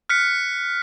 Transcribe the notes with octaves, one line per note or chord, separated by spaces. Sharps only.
F6 F#6 B6 C#7